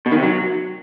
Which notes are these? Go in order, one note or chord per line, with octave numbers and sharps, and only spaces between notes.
B2
D#3
C3
F#3